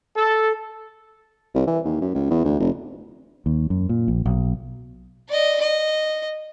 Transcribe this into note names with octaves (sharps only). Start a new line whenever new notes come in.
A4
C2
E3
D#2
F#2
C#2
E2
D2
F1
D#2
F#2
A#2
A#1
B1
D5 D#5
D#5